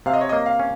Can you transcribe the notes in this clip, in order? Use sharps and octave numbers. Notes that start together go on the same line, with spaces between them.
C3 F5
D#5
C#5
A#3 D#5
F5
C#4